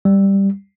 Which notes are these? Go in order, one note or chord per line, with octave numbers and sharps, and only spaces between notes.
G3